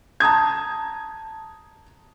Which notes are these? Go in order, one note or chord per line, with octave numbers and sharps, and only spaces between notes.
A5 A#5 D#6 G#6